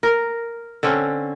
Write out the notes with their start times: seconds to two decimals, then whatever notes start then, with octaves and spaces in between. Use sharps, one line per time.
0.03 A#4
0.83 D3 C4 C#4